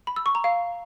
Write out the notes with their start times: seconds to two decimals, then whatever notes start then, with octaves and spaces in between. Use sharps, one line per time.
0.07 B5
0.16 E6
0.26 C#6
0.35 A#5
0.44 F5